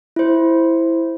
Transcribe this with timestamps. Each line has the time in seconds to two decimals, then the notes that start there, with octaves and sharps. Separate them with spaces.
0.16 E4 C5